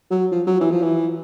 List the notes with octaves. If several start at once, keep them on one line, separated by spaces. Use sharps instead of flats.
F#3
F3
F#3
E3
F3
E3